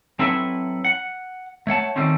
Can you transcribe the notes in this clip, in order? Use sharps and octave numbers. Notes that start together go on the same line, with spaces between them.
F#3 C4 E4 A4 B4 E5
F#5
A3 C#5 F#5 A5
D#3 F3 G3 A3 C4 C#4